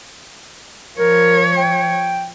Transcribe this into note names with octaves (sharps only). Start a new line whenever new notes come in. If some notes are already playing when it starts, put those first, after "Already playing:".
F3 A#4 C#5
G5